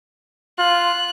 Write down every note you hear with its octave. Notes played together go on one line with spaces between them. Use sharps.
F4 F#6